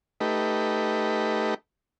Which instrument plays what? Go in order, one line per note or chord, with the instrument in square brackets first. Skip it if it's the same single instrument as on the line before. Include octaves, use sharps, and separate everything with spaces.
[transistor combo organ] A3 D#4 G4 B4